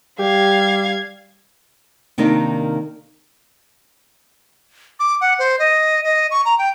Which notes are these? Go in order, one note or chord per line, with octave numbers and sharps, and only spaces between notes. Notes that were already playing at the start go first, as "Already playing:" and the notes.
G3 G4 F5 G#6
C3 D#3 A#3 D4 D#4
D6
F#5
C5
D#5
D#5
C#6
A#5
G5